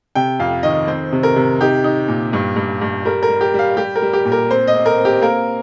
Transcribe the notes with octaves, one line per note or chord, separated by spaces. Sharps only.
C3 G5
F2 F5
D#3 D#5
C4 C5
C3
A#4
C3
D#4 G4
D#4
A#2
G2
G2
G2
G3 A#4
A#4
G3
G4
G3 F5
G3 G4
A#4
G3
G4
A#2
A#4
C4 C5
D#5
C4
A#4
C4
G4
A#3 A#4